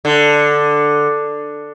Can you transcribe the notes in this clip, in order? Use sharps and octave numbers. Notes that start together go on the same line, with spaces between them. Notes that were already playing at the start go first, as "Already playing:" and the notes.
D3